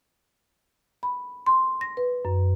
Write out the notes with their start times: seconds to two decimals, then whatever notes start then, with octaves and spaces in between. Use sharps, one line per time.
1.03 B5
1.46 C6
1.81 A#6
1.97 B4
2.25 F#2